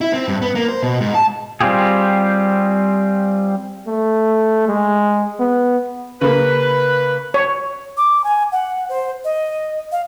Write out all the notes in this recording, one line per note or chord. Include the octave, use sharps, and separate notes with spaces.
E4
C4
G2
B3
A#3
C5
B2
G#2
A5
G3 C4 F4 G4 G#4
A3
G#3
B3
C#3 A#3 B4
C#5
D6
G#5
F#5
C5
D#5
F5